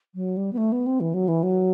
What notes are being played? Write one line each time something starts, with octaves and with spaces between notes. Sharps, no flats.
F#3
G3
B3
A3
B3
C4
E3
F#3
E3
F#3